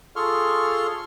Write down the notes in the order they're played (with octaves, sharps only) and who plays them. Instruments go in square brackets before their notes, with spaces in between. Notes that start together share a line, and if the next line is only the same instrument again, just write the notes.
[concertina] F4 G#4 A4 C6 C#6 F6